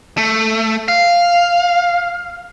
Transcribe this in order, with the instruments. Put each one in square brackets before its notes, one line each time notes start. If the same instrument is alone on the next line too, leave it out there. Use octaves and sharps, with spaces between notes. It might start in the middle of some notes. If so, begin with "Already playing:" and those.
[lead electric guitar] A3
F5